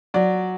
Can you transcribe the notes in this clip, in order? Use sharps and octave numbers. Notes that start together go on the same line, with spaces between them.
F#3 D5